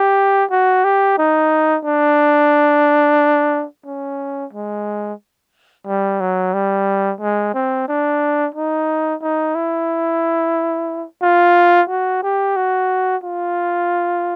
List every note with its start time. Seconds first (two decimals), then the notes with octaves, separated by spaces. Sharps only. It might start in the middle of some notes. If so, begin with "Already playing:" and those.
Already playing: G4
0.51 F#4
0.84 G4
1.18 D#4
1.85 D4
3.86 C#4
4.53 G#3
5.87 G3
6.20 F#3
6.54 G3
7.21 G#3
7.54 C4
7.88 D4
8.55 D#4
9.22 D#4
9.55 E4
11.22 F4
11.89 F#4
12.23 G4
12.56 F#4
13.24 F4